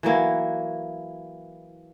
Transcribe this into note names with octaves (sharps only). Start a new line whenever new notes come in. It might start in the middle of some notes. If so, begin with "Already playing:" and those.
E3 F#3 A#3 E4